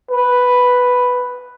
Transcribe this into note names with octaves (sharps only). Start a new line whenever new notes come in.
B4